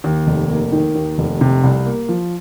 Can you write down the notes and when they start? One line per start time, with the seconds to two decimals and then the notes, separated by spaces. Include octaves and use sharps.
0.04 D#2
0.27 F1
0.50 A#3
0.72 D#3
0.95 D#2
1.18 F1
1.41 C3
1.64 C2
1.86 A#3
2.09 F3